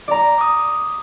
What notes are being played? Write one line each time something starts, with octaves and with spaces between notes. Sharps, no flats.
D5 A#5
D6 D#6